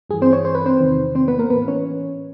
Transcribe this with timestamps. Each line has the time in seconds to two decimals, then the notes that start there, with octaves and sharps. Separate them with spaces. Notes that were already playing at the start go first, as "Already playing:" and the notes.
0.09 G2 E3 G#4
0.22 C4 C5
0.33 C#5
0.45 C5
0.55 B4
0.66 C4 C5
0.80 E2 C3 D#3
1.15 C4 C5
1.28 B3 B4
1.38 A#3 A#4
1.50 A2 E3 B3 B4
1.68 C#4 C#5